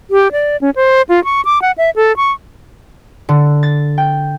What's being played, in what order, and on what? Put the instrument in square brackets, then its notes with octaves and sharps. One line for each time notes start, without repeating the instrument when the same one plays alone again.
[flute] G4
D5
C#4
C5
F4
C#6
D6
F#5
E5
A4
C#6
[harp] D3
A6
G5